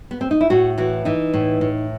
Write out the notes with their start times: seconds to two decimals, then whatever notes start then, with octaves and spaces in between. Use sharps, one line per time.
0.11 B3
0.21 C4
0.31 D#4
0.41 E4
0.50 A2 F#4
0.78 E3 F#4
1.05 E3 D#4
1.34 A2
1.61 A2